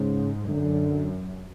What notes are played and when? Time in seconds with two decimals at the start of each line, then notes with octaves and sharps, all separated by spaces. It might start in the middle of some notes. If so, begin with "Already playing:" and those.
Already playing: G#2 C#3
0.49 F#2 D3